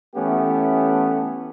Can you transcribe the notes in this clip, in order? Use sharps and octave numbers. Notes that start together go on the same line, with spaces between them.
E3 A3 B3 C#4 G4